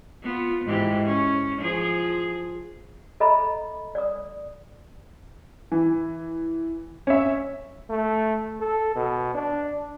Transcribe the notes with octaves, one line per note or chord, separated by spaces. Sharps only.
B3 F4
G#2 E3 G4
C#4
F3 G#4
A4 D#5 E5 A#5 B5
D5 D#6
E3
C#4 E5
A3
A4
B2
D4